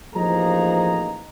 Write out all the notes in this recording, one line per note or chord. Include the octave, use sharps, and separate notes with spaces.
A1 F3 A#3 D#4 G#4 A#5